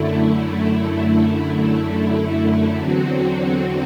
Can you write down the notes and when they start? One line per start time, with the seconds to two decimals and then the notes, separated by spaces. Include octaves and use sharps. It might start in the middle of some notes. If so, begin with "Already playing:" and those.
Already playing: F#2 D3 A3 E4
2.77 E2 D3 F#3 C4 F#4